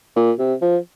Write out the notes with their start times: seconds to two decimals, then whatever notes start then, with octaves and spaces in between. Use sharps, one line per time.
0.16 A#2
0.39 C3
0.62 F3